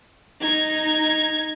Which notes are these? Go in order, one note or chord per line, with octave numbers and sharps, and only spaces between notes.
D#4 G#6